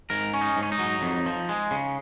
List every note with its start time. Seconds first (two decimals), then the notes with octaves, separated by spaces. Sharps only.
0.10 G#2 A#4
0.34 C#4
0.41 D#4
0.57 G#2
0.63 C#4
0.72 D#4
0.79 F#3
1.02 F2
1.26 F3
1.49 G#3
1.71 C#3